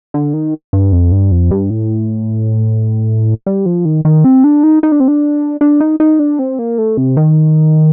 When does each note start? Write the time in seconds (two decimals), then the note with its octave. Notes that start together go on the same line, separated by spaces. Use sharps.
0.14 D3
0.34 D#3
0.73 G2
0.92 F2
1.12 G2
1.32 F2
1.51 G2
1.70 A2
3.46 G3
3.66 F3
3.85 D#3
4.05 D#3
4.24 C4
4.44 D4
4.63 D#4
4.83 D#4
4.92 D4
5.00 C4
5.08 D4
5.61 D4
5.80 D#4
6.00 D#4
6.19 D4
6.39 C4
6.59 A#3
6.78 A3
6.97 C3
7.17 D#3